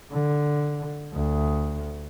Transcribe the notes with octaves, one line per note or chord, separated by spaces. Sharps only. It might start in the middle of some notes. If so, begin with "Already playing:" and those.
D3
D2